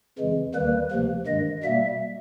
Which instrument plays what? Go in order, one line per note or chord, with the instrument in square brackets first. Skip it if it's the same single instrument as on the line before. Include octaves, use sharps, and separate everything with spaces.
[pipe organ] F2 C#3 E3 G#3
D#2 D#3 G3 A#3 B4
D2 C3 F3 A#3
G2 D#3 G#3 D#5
B2 G3 A#3 E5